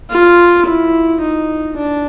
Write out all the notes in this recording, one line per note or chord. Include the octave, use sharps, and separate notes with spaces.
F4
E4
D#4
D4